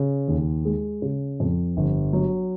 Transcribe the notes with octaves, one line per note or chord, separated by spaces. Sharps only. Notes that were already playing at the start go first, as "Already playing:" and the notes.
Already playing: C#3
D#2
G#3
C#3
F2
G1
F#3